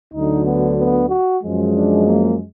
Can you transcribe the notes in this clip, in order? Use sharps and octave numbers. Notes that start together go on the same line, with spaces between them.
D2 D3 F#3 D#4
B3
B3
F#4
F#2 F3 G#3
D4
A#3